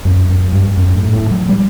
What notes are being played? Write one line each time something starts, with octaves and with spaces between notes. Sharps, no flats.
F#2
F#2
G2
F#2
A2
A2
F#3
G3